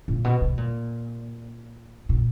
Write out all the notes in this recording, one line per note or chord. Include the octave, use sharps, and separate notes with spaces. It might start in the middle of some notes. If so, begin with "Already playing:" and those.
A#2
B2
B2
A#2
A#2